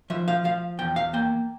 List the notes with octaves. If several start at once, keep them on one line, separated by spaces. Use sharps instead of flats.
F3 E5
F5
F3 F5
E2 G5
F5
A#3 G5